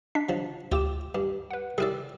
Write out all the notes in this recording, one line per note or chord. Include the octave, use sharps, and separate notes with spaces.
D4 D#5 B6
F3 F#3
D2 F4 G4 E5 D6 E7
G2 G4
B4 F#5
G3 E4 G#4 A#4 D5 E6